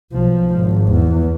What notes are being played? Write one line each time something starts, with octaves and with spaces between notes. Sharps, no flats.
B1 F3
G#1
E2